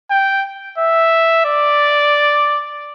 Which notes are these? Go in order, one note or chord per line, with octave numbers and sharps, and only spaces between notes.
G5
E5
D5